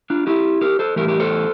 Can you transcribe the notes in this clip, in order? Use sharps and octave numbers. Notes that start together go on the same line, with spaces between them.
D4 F4
E4 G4
G4 A#4
A4 C5
A2 E3 G3 G4 A#4
G4 A#4
A4 C5